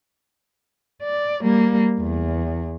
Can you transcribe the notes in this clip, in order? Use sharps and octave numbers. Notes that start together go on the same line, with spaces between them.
D5
G3 A#3
E2